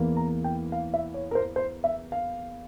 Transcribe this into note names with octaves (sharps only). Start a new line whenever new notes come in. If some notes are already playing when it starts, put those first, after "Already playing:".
Already playing: E2 E3 A#3
A#5
G5
F5
E5
C#5
A#4
C5
C5
E5
F5